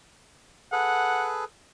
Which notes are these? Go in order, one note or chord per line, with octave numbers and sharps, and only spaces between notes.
G#4 A4 B4 F#5